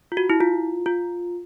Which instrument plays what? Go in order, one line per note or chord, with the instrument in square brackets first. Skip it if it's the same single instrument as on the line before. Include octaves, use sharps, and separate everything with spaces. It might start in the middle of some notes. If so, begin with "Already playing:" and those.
[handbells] F4
F#4
E4
F4
F4